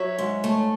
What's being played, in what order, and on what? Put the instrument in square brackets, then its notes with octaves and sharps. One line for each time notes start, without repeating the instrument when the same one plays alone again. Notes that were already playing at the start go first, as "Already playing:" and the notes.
Already playing: [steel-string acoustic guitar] F#3 C#5 E5
G#2
A3